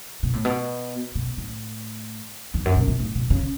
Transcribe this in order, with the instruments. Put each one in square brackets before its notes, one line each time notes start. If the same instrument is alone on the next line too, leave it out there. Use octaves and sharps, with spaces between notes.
[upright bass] B2
A2
B2
B2
A2
E2
F#2
B2
B2
A2
B2
C#3